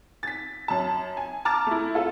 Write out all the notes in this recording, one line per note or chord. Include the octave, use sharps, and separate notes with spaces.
A6 B6
F#2 A5
G#5
A5 A#5 D6 F6 A6
A3 E4
F4 A4